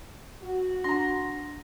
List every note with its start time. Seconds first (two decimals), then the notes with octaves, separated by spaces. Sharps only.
0.41 F#4
0.84 D4 A#5 C6 A#6